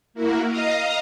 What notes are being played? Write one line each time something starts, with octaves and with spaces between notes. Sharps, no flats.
A#3 E4 F#4 A#4
D#5 F5 A#5 D#6